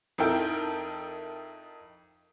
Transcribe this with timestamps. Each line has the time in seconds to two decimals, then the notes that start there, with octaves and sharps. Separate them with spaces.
0.18 F2 D#4 E4 A4 A#4 G5